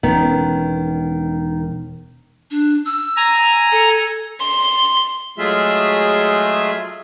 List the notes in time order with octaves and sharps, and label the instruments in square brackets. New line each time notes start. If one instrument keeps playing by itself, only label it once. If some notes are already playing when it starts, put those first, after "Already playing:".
[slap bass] E1 C#4 [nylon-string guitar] D#3 B3
[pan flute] D4
E6
[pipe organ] G#5 A#5
[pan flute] A4
[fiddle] C6
[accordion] F#3 G#3 A3 F4 G#4 E5